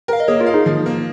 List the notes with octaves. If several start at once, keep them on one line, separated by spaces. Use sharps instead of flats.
A#4 F5
D#5
A#3 G#4 C#5
F4 A#4
F5
D#4 G#4
F3
A#3